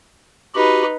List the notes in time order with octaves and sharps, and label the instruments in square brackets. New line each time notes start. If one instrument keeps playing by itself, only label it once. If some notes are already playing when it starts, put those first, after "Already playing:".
[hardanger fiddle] D#4 B4 [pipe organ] F#4 G4 B5